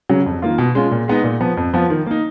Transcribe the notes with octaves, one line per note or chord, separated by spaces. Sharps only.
C#3 F#3 C#4
F2
D#3 A#3 F4
B2
G#3 C#4 F4
A#2
G#3 B3 D#4
A#2
F3 B3
F2
F3 B3 F4
D#3
A#3 D#4